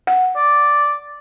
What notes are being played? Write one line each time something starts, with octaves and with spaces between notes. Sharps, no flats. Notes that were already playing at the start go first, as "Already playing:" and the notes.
F#5
D5